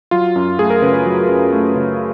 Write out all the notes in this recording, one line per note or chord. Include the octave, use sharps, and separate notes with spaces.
F#3 F4
F#2
A3 G#4
A#4
C#3 B4
B4
F#3
F#2
A3
C#3